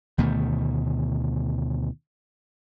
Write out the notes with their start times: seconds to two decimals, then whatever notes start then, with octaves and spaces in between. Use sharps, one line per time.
0.18 D2 B2 D#3 A3